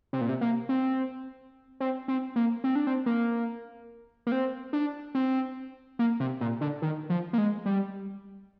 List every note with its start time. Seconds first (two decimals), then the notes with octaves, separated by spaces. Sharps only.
0.13 C3
0.21 A#2
0.29 C3
0.41 A#3
0.69 C4
1.80 C4
2.08 C4
2.36 A#3
2.64 C4
2.75 D4
2.87 C4
3.06 A#3
4.26 A#3
4.32 C4
4.73 D4
5.15 C4
5.99 A#3
6.20 C3
6.41 A#2
6.61 D3
6.82 D#3
7.10 F3
7.33 A#3
7.38 G#3
7.66 G3